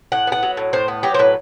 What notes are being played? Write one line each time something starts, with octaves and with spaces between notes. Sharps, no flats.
A2 F#5
B3 F#5
F#3
A2
A2 C5
B3
F#3 G4
C5
A2 B4